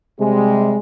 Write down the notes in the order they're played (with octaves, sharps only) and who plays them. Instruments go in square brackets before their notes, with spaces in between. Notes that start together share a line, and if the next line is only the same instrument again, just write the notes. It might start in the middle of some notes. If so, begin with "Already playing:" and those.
[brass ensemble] C3 G3 G#3